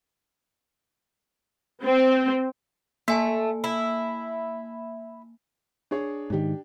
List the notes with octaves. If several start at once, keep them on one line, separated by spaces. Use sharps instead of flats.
C4
A3 A#3 G#5 A5
E4
D4 G#4 C#5
G#2 D#3 D4 G4